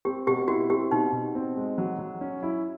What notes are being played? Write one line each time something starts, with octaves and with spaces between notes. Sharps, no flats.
C4 G4
B2 G4
E4 F#4
C4 G4
B2 D#4
B2
C4
G#3
F#3
F#3
C#4
E4